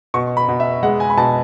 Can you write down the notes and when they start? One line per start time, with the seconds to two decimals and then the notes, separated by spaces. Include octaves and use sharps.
0.14 B2 C#6
0.37 B5
0.48 B2
0.60 E5
0.83 G#3 F#5
1.00 G#5
1.10 B5
1.17 B2 A5